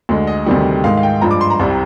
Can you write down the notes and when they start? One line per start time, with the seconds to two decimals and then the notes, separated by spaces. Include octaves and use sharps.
0.09 D2 D3 G#3
0.27 D#5
0.46 D2 C3 D#3 G3
0.84 G#2 D#3 G#3 F5
0.97 F5
1.03 G5
1.21 G2 F3 G#3 A#5
1.31 D6
1.41 C6
1.50 A#5
1.59 C2 C3 G3